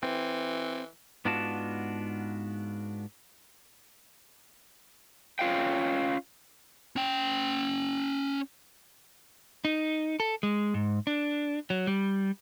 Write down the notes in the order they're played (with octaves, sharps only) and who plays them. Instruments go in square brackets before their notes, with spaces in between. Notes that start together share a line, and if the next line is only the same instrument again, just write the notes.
[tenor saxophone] E3 [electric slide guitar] C4
[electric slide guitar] G#2 B3 D4 F4 F#4 A5
C#4 F4 F5 G5
[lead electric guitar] C#4 G5
[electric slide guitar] D#4
A4
G#3
G#2
D4
F#3
G3